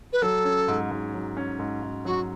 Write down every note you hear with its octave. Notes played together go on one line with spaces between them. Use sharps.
B4
F#3 A4
C#4
G#2
G#2
F#3
C#4
G#2
G#2
F#3 F#4